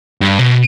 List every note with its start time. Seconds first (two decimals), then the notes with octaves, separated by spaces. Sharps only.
0.21 G2
0.39 B2